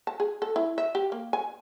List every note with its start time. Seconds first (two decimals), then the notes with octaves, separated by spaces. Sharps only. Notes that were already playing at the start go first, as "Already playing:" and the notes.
0.07 A5
0.20 G#4
0.42 A4
0.56 E4
0.78 E5
0.95 G4
1.12 A#3
1.33 G#5